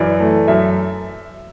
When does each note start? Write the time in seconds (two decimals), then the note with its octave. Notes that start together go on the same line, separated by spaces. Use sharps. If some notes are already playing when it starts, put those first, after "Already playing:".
Already playing: F#2 E3 D5
0.20 A3
0.48 F#2 E5